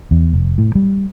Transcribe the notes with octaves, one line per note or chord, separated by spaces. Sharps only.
E2
F1
A2
G3